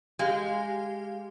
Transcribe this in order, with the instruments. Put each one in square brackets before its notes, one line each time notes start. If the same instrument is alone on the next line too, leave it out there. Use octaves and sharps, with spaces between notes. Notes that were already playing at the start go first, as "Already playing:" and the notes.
[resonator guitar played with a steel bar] G#3 [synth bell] G4 F5